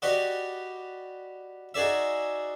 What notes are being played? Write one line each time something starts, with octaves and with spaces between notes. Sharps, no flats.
F#4 G4 B4 D5 D#5 F#5
D#4 F#4 G#4 D5 E5